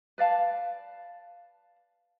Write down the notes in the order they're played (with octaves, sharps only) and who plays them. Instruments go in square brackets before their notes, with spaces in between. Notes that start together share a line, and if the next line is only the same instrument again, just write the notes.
[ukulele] B4 D5 F5 A5